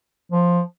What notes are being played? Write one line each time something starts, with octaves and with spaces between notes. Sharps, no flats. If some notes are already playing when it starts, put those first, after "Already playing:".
F3